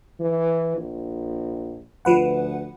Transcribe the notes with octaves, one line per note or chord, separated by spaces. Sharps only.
E3
A#1
D2 F3 B4 F#5